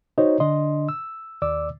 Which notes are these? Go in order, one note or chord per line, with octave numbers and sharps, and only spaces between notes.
D#4 F#4 C5 C#5 D#5
D3 D4 D#5 C6
E6
D#2 D5 D6 E6